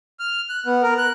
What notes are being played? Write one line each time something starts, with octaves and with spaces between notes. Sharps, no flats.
F6
F#6
B3
A#4
F#6